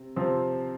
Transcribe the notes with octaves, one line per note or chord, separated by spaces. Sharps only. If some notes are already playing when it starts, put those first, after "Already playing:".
Already playing: C3
C3 F3 C4